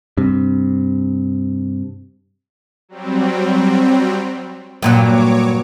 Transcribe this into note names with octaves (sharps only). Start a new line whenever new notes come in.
G2 C3
F#3 G3 C4
G2 A#2 F#3 C#5 D6